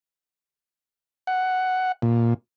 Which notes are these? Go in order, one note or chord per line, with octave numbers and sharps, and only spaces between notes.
F#5
A#2